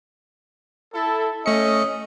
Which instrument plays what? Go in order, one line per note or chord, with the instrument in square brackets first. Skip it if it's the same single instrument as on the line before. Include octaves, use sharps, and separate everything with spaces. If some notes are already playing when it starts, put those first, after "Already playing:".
[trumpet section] E4 A4
[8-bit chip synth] A3 C#7 [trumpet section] C#4 D#5